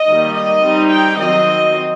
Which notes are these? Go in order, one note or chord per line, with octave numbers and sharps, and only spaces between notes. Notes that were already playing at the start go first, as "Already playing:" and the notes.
Already playing: D#5
D#3 G3 A#3
D#5
G3 C4 D#4
G5
D#3 F#3 C4 D#5